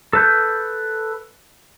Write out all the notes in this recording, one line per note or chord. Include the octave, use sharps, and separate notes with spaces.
A4 B4 G6